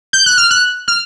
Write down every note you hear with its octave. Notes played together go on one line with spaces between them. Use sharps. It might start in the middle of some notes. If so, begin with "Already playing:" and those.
G6
F#6
F6
F#6
F6